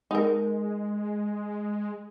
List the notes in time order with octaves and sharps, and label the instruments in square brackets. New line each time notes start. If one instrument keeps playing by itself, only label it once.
[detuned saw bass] G#3 [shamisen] D#4 A#4